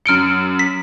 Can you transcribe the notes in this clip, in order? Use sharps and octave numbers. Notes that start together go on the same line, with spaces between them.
F#2 F6 C#7 D7 G7
B6